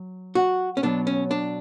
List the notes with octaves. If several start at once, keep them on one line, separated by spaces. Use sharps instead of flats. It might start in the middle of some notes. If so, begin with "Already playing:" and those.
Already playing: F#3
F#4
C#4
B2 F#3 D4
C#4
D4